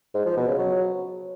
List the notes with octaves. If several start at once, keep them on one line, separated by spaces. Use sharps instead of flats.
G#2
F3
B2
C#3
F#3